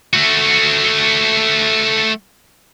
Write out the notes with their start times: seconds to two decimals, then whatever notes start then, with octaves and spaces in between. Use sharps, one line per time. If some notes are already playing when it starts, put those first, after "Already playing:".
0.13 A3 F#4